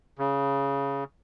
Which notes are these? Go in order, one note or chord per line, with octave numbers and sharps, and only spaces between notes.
C#3